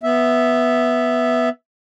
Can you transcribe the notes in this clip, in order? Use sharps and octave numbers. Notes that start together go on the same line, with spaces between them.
B3 E5